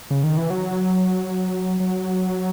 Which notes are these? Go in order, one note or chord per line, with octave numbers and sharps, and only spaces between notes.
C#3
D#3
E3
F#3
F#3